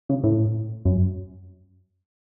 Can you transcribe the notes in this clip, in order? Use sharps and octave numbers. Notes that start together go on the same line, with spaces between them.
C#3
A2
F#2